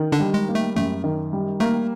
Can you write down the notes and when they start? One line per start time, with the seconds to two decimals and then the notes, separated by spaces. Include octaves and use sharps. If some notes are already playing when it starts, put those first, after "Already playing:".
Already playing: D#3
0.12 D3 D4
0.20 G3
0.34 G#3
0.48 A#3
0.55 A3
0.76 F#2 A3
1.04 D#3
1.33 G3
1.60 A3 A#3